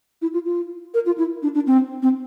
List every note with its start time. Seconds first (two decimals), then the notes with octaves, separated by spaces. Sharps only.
0.22 E4
0.33 F4
0.46 F4
0.94 A#4
1.06 F4
1.18 E4
1.42 D4
1.54 D4
1.66 C4
2.02 C4